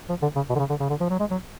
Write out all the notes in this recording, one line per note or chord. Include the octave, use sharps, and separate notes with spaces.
F3
D3
C#3
B2
D3
C#3
D3
C#3
D3
F3
F#3
G#3
F#3